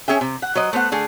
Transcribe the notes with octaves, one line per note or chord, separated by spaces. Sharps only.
C#4 G#4 E5 G5
C3
F#5
F#3 C5 D#5
A3 B3 C5 F#5
D3 A3 G#4